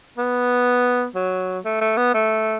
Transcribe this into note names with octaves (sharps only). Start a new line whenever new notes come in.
B3
F#3
A3
A3
B3
A3